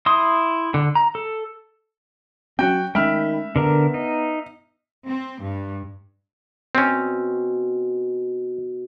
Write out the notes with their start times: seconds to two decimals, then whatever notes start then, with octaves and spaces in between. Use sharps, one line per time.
0.06 E4 C6 D#6
0.74 D3
0.95 A#5
1.15 A4
2.59 F#3 C4 C#4 F#4 G5
2.95 D#3 G#3 A3 C#4 E5 G5 B5 F6
3.56 D3 B3 A#4 A#5
3.94 D#4
5.08 C4
5.42 G2
6.75 B2 C4 C#4